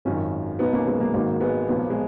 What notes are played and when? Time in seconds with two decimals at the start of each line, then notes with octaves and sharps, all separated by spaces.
0.05 G#1 F#2 D#3 C#4 F4
0.59 B1 B2 B3 D#4
0.73 A#3 C#4
0.87 G#3 B3
1.00 F#3 A#3
1.13 G#1 G#2 D#3 F#3 A#3
1.41 G#3 B3
1.67 B1 A#2 F3 B3
1.79 A#3
1.90 G#3